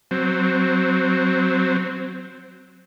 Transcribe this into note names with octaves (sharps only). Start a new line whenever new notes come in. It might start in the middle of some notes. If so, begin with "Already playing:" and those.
F#3 C4